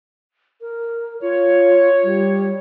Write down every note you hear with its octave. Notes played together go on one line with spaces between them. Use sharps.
A#4
F4 C#5
G3